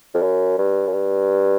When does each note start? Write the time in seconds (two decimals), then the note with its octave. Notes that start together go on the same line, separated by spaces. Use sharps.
0.14 F2
0.23 F#2
0.58 G2
0.87 F#2
0.93 G2